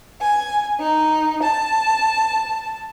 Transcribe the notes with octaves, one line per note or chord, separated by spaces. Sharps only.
G#5
D#4
A5